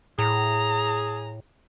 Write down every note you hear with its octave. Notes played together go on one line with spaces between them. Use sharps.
A2 G#4 A#5